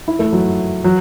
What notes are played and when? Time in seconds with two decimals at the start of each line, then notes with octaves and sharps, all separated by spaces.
0.08 E4
0.19 A3
0.32 F#3
0.84 F#3